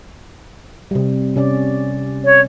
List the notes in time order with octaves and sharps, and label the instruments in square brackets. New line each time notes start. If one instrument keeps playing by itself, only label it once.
[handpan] C3 G3
C3 C#4 D5
[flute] C#5